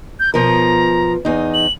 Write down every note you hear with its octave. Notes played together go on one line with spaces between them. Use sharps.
G6
B2 F3 A#4 A#5
E2 D#4
F#7